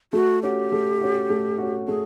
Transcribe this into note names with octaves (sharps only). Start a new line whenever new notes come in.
A3 F#4
C#4 F#4 G4
A3
C#4 F#4
A3
C#4 F#4
A3 G#4